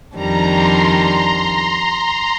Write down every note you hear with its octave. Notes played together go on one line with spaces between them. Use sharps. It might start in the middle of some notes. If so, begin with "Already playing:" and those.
F2 D#3 G3 D4 A#5
C6